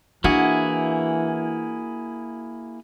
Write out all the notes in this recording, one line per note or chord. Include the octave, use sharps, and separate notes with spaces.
E3 A#3 D4 E4 F#4 G#4